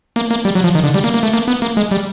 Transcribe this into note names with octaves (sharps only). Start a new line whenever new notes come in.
A#3
A#3
G3
F#3
F3
D#3
D3
G3
A#3
A#3
A3
A#3
B3
A#3
G#3
G3